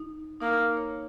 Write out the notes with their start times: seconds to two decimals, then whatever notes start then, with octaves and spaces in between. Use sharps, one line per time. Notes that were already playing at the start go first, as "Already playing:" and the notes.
Already playing: D#4
0.40 A#3 D#4
0.53 D#4
0.77 C#5